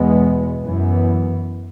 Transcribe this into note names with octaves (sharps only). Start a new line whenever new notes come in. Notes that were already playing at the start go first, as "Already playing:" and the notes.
Already playing: E2 B2 G#3 B3
F#2 E3 B3